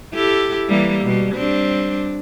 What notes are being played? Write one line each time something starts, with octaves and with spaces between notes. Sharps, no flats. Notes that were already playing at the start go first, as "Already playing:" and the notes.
E4 G4 A4
E3 G3 A#3
B2 G3
G3 C4 D4